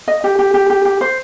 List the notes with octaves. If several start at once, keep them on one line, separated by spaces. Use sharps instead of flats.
D#5
G4
G4
G4
G4
G4
C5